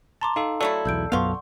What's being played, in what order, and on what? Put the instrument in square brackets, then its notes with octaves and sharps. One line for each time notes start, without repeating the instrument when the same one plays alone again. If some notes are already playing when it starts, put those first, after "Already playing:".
[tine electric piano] A5 [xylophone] A#5 C6 D6
[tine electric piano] D#4 A4 [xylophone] F5
[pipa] F#3 A3 E4 [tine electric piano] A4 [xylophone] D5
[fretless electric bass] B1 E2 [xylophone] E6 G6 D7
[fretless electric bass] B1 F#2 B3 [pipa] F3 F5 [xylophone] F#5 C6 C#6